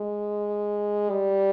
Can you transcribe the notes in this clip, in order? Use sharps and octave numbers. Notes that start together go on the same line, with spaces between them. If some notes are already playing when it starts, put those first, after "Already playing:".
Already playing: G#3
G3